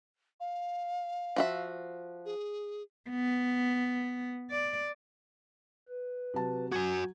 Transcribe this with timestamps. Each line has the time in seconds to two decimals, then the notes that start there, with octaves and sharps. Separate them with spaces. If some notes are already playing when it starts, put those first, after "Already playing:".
0.40 F5
1.36 F3 F#4 E5
2.25 G#4
3.09 B3
4.51 D5
5.89 B4
6.34 C3 F#3 A5
6.72 F#3 F#4 G#5 G#6